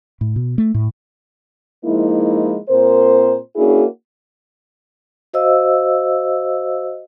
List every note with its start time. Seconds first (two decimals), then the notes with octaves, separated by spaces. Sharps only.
0.21 A2
0.36 B2
0.58 A3
0.74 A2
1.85 F3 G#3 A#3 D#4 E4
2.69 A#2 C4 A#4 C5
3.56 A#3 C#4 D4 E4 F#4 G#4
5.33 F#4 C5 D#5 F5 E6